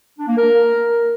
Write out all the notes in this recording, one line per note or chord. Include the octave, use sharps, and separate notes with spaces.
D4
A#3
A#4